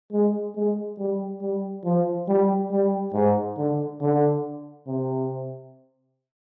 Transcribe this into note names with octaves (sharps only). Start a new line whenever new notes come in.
G#3
G#3
G3
G3
F3
G3
G3
G#2
D3
D3
C3